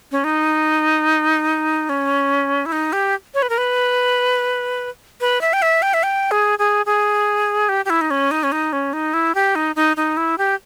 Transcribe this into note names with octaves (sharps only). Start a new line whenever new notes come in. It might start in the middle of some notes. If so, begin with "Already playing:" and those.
C#4
D#4
C#4
E4
D#4
G4
C#5
B4
A#4
B4
B4
E5
G5
E5
G5
E5
G5
G#4
G#4
G#4
G4
G4
E4
D#4
C#4
D#4
C#4
D#4
C#4
D#4
E4
G4
D#4
D#4
D#4
E4
G4